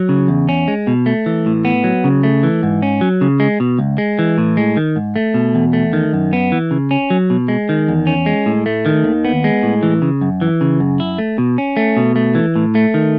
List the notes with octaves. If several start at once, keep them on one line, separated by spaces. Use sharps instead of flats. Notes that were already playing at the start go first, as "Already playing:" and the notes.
Already playing: F#3
C#3
E2
C#4
G#3
B2
A3
E3
A2
B3
F#3
C#3
A3
E3
G#2
C#4
F#3
C#3
G#3
B2
C#2
G#3
E3
A2
G#3
D#3
G#2
A3
B2
E2
A3
D#3
F#2
B3
E3
C#3
C#4
F#3
B2
G#3
D#3
E2
C#4
G#3
A2
A3
D#3
D#2
B3
G#3
A2
E3
C#3
F#2
E3
C#3
F#2
E4
A3
B2
C#4
A3
B2
A3
E3
A2
A3
D#3